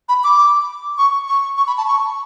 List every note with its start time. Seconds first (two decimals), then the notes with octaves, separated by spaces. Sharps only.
0.09 B5
0.24 D6
0.98 C#6
1.28 C#6
1.57 C#6
1.67 B5
1.78 A5
1.87 C#6